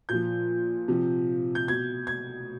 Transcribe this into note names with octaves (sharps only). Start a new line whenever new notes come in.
A#2 F3 G6
C3 F3
G6
B2 G#6
G#6